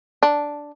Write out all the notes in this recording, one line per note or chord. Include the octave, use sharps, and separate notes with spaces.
D4